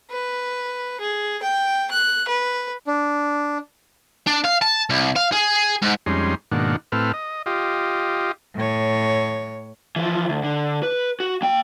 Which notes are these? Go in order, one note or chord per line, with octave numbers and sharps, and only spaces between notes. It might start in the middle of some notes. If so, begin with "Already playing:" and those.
B4
G#4
G5
F#6
B4
D4
D4
F5
A5
C2
F5
G#4
G#2
F2 G3 G#3 C#4 D#4 C6
G#2 B2 D#3 A#3 D4 F#5
A2 C4 A4 B4 F6
D#5
F4 G4 D#5
A2 C#5
E3 F3
D2
D3
B4
F#4
A#3 G5